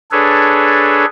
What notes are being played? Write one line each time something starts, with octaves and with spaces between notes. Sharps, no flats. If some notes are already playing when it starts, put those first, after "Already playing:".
D4 G#4 A4 B4 C#5